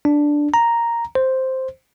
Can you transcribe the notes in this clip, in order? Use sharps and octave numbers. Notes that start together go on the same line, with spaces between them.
D4
A#5
C5